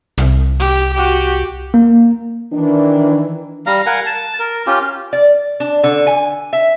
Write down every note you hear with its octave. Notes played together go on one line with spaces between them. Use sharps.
C2
G4
F#4 G4
A#3
D#3 E3 D4
G3 F5 A#5
A#4 F5 F#5 G#5
A5
A#4
C#4 F4 G4
D5
D4
D3
G#5
E5